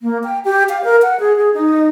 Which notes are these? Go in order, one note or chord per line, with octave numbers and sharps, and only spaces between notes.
A#3
G5
G4
F5
A#4
F#5
G#4
G#4
D#4